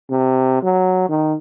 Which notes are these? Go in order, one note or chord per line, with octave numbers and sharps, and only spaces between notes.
C3
F#3
D#3